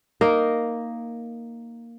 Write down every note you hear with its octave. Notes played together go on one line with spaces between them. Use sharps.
A#3 D#4 A#4